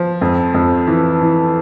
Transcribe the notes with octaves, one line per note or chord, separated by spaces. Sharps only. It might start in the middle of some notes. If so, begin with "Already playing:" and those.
Already playing: F3
F2
F2
E3
E3